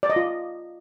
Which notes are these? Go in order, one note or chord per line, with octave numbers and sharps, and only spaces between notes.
D5
D#5
F4